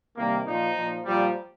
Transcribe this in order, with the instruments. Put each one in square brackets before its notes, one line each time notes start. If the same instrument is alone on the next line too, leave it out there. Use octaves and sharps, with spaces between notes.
[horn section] C3 D#3 G3 A#3
A#2 F3 D#4
A#2 F3
A#2 F3 G3